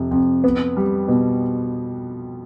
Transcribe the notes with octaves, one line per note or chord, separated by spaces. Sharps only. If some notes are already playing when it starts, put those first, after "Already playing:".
Already playing: F2 C3
F2
B3
G3
B2